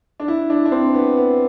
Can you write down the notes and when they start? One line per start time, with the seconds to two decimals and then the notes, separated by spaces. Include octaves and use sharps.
0.20 D4
0.28 E4
0.50 D4
0.65 D4
0.72 C4
0.94 B3
1.17 B3